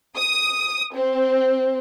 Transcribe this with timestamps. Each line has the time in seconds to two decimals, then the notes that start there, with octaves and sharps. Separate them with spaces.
0.18 D#6
0.96 C4